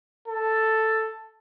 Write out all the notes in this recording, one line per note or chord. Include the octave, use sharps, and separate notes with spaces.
A4